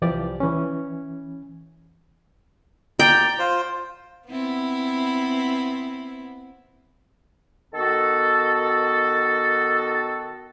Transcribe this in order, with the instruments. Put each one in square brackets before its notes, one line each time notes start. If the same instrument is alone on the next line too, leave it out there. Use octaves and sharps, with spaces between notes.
[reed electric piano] C2 E3 F3 G4 D5
E3 C#4
[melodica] D5 A#5 [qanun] G5
[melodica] F4 C5
[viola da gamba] B3 C4 E4
[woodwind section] D#3 B3 F#4 A4